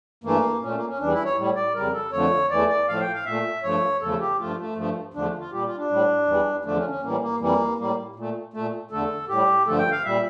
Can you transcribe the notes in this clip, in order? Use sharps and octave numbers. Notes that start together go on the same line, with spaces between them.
G2 E3 A3 A#3
A#2 A3 C#4
A#3
C#4
E2 E3 G3 D4
E4
C#5
A2 G3
D5
F2 C#3 G3 A#4
A4
F2 D3 F3 A3 C#5
E2 E3 A3 D5
D5
A2 F3 A3 F5
G5
F5
A#2 A3 E5
G2 F3 A3 C#5
E2 C#3 F3 A3 A4
G4
G2 F3 A3 F4
A3
G2 F3 A3
E2 D3 F3 A3 D4
F4
A#2 G3 G4
F4
D4
A2 G3
E2 E3 G3
E2 D3 F3 A3 D4
C#4
C#4
A2 E3 G3 A#3
A#3
F2 E3 G3 A#3
A2 G3 A#3
A#2 A3
A#2 A3
E2 D3 A3 A4
A2 G3 G4
G2 D3 F3 A3 A4
G5
F5
A#2 G3 E5